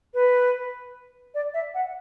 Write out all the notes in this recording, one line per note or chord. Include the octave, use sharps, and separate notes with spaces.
B4
D5
E5
F#5